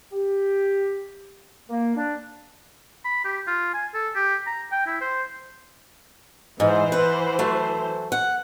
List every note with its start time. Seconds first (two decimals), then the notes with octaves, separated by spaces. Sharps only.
0.12 G4
1.70 A#3
1.96 D4
3.05 B5
3.25 G4
3.47 F4
3.74 G#5
3.94 A4
4.15 G4
4.46 A#5
4.72 G5
4.86 E4
5.01 C5
6.60 G#2 E3 C5
6.92 B4 F#5
7.39 F#3 A3
8.12 F#5